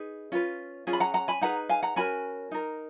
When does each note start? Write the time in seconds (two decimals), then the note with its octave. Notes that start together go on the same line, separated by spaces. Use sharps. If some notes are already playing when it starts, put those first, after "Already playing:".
Already playing: D#4 G#4 B4
0.32 C#4 F4 B4
0.87 C#4 F4 G#4
0.93 B5
1.00 F#5 A#5
1.14 F#5 A#5
1.28 G#5 B5
1.41 D#4 G#4 B4 F#5 A#5
1.69 F5 G#5
1.83 F#5 A#5
1.96 C#4 F#4 A#4 G#5 B5
2.51 D#4 A#4